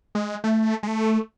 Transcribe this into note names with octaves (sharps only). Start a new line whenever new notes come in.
G#3
A3
G#3
A3